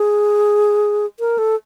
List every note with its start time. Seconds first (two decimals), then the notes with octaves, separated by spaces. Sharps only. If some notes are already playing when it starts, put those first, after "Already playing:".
Already playing: G#4
1.20 A#4
1.38 A4